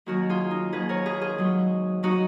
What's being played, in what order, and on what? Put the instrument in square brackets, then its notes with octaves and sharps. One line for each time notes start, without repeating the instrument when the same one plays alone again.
[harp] D#2 D#3 F#3 F#4 A#4
F4 G#4
D#4
D#2 D#3 F#3 G#4 B4
A#4 C#5
G#4 B4
F4 G#4
G#2 F#3
F#3 D#4 F#4